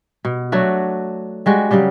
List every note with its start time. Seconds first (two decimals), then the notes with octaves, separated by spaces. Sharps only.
0.25 B2
0.52 F#3 A3 D4 F#4
1.46 G3 G#3 F#4
1.71 C#3 F#3 G3 G4